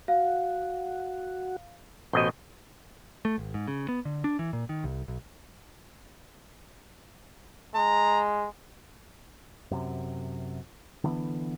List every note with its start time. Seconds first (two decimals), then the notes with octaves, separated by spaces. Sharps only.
0.08 F#4 F5
2.13 A1 B2 C5 D#5 C6 G6
3.25 A3
3.38 G#1
3.54 G#2
3.68 C#3
3.89 B3
4.05 D3
4.24 D4
4.39 E3
4.53 A#2
4.69 D#3
4.84 C2
5.08 B1
7.75 G#3 A#5
9.71 F#2 C3
11.04 D3 E3 B3